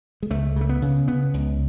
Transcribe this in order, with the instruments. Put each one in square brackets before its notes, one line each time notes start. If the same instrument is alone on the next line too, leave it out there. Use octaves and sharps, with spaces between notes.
[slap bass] G#3
C#2 A3
C#3 A3
B3
C#3
C#3 B3
C#2